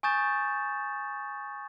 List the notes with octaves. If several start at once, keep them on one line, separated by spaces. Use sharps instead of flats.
G#5 C#6 D#6 G6 A6 E7